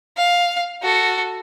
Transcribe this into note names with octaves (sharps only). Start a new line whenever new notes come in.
F5
F#4 A4